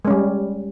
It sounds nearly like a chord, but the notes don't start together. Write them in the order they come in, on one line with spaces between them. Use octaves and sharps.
G#3 C#4 G3